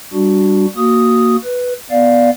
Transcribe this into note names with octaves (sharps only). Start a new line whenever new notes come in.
G3 D4 F#4
A#3 F#4 D#6
B4
B3 D5 F5